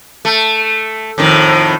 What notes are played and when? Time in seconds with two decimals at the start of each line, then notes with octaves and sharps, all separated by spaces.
0.25 A3
1.18 F2 A2 D#3